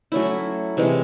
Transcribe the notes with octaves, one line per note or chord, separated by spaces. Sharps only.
F#3 A3 C#4 E4
C3 E3 G#3